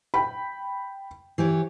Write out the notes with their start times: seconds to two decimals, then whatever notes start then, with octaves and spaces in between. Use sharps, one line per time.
0.14 G5 B5
1.38 E3 G4 C#5